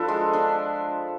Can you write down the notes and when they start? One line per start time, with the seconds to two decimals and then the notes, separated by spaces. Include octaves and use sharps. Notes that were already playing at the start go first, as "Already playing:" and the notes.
Already playing: F3 D4 A4 B4
0.08 G#3
0.33 D4